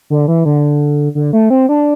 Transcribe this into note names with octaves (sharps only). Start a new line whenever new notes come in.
D3
E3
D3
D3
A3
C4
D4